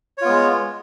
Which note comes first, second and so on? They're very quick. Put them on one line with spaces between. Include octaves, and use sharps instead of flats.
C#5 F4 B3 G#3